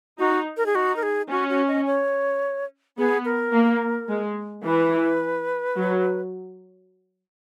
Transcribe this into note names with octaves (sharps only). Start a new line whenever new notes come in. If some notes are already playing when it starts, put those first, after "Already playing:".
D#4 F#4
A#4
G#4
D#4 F#4
A#4
G#4
C#4 F#4
F#4
D#5
C#5
B3 G#4
A#4
A#3
G#3
E3 B4
F#3